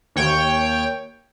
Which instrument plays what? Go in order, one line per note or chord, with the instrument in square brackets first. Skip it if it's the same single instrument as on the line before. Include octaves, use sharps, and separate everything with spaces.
[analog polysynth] D#2 C#5 G5